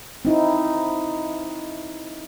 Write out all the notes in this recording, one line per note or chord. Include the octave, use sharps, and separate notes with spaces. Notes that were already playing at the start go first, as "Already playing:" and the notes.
C4 D#4 E4